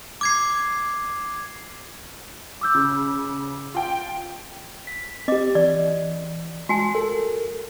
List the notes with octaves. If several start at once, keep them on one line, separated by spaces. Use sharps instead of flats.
D6 G#6 C7
D6 E6 G6
C#3
F4 G5
B6
C4 G4 D#5 D6
E3 D5
G#3 F#4 G#5 A5
A4 A#4